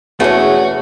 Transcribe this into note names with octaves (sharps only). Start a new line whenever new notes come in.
E2 B2 A3 C#4 F#4 G#4